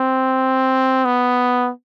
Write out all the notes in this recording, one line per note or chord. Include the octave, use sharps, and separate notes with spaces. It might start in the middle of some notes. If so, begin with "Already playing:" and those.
Already playing: C4
B3